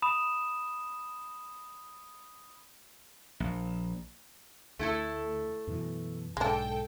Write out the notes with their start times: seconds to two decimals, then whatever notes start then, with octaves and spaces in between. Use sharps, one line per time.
0.02 B5 D#6 E7
3.40 A#1
4.79 D2 A3 E4 A4
5.67 F#2 B2 E3
6.37 B1 G#2 G#3 D4 A4 G5